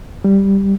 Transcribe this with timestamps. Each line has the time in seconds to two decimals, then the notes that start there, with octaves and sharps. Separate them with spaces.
0.24 G3